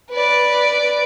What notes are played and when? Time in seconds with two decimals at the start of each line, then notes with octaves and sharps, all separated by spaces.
0.11 B4 D5